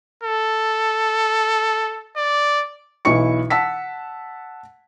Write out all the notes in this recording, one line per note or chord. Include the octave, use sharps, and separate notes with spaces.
A4
D5
B1 E3 E4 C#6 C#7
F#5 A5 E6 B6